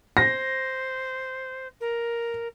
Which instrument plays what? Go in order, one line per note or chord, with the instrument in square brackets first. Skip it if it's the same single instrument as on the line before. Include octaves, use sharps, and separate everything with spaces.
[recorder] C5 [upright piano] A#6
[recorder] A#4